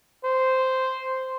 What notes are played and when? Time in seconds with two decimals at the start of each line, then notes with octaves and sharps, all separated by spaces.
0.24 C5